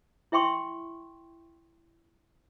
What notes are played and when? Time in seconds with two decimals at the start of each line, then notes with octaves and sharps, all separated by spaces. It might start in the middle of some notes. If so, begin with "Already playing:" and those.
0.32 E4 E5 G5 C6 C#6